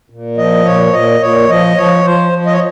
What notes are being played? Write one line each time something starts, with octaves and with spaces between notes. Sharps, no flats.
A#2
F3 D#5
A#2 C#5
A#2 D#5
A#2 C#5
F3 D#5
F3 C#5
F3 C5
F3
D#5
C#5